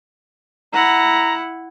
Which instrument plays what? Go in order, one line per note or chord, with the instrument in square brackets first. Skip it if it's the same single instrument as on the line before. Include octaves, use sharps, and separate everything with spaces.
[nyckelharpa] E4 F#5 [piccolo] A#5